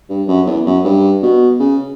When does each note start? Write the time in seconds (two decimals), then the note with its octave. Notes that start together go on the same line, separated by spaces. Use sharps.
0.10 G2
0.28 F#2
0.47 E2
0.66 F#2
0.85 G2
1.23 B2
1.60 C#3